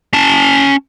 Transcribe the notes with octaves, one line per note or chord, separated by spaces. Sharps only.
C#4 A5